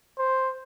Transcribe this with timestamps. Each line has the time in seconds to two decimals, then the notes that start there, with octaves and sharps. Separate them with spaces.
0.18 C5